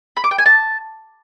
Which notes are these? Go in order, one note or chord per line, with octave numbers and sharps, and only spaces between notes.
B5
D6
G5
G#5
A5